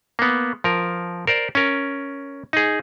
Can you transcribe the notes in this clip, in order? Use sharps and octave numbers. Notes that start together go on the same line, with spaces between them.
A#3 B3
F3 A#4
A#4 C5 D5
C#4 A#4
D#4 G#4